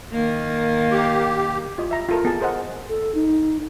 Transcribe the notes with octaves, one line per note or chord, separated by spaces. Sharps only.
D#3 A#3
G4
F4 D#5
E5 A#5
F4 A4 A#4
B3 G#4 A5
G#4 A#4 C5 D#5 F#5
A4
D#4